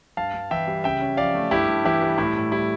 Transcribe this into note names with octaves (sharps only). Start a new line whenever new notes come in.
G2 F5 A5
G2
E3 E5 G5
G3
C#3 E5 G5
C#4
F3 D5 F5
A3
G2 E4 G4
G2
E3 E4 G4
G3
A2 E4
A2
G3 E4